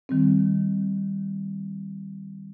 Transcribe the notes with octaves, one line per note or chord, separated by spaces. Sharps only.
D#3 G3 C4